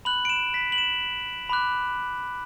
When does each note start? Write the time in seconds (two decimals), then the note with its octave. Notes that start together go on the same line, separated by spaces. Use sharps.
0.05 B5 F#6 F#7
0.25 D7
0.29 E7
0.54 B6
0.72 F#7
0.78 E7
1.49 B5 D6 F#6